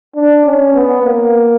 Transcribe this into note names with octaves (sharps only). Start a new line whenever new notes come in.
D4
C#4
B3
A#3